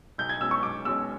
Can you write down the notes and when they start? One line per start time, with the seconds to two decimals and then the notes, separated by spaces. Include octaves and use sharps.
0.18 B1 G6
0.29 G#6
0.40 B2 G#3 C#4 E6
0.51 C#6
0.63 B1 D6
0.85 B2 G#3 C#4 E6